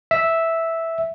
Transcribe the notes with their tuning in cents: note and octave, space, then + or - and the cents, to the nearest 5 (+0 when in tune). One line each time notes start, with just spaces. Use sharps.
E5 -5